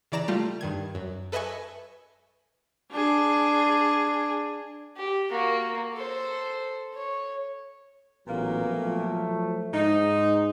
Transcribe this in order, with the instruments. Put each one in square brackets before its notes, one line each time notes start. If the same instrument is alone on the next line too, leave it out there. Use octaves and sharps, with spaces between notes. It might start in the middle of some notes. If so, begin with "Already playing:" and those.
[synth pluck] C#3 E3 D5 A#5 A#6 E7
G3 A3 F4 G4
G2 D#3 G#6
F#2
A4 B4 D#5 E5 G#5 C#6
[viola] D4 G#4
[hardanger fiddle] G4
A#3 F#4
A4 C5
C#5
[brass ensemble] A1 F#3 [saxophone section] A#2 A#3 B3
[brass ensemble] F3 F#3 A3
[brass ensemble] G#2 [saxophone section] D#4